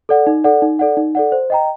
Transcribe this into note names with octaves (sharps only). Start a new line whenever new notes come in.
A4 D5 F#5
D#4
A4 D5 F#5
D#4
A4 D5 F#5
D#4
A4 D5 F#5
C5
D#5 G5 A#5